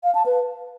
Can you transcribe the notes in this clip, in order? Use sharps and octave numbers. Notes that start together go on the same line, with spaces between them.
F5
A5
B4